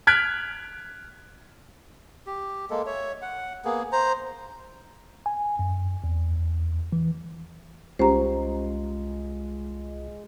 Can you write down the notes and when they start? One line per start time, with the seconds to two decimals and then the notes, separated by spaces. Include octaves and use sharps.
0.07 F6 F#6 G#6 B6 D7
2.27 G4
2.70 G#3 A#3 A4
2.86 C#5 E5
3.22 F#5
3.65 A#3 B3 G#4
3.92 C5 A#5
5.26 G#5
5.59 F#2
6.04 E2
6.92 E3
7.99 C2 G#3 C#4 F4 G4 C5 A#5